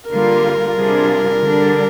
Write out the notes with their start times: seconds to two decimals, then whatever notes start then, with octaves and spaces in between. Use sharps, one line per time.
0.10 D3 G3 A#3 F4 A#4
0.76 C3 G3 D4 F4 G#4
1.42 D3 G3 D4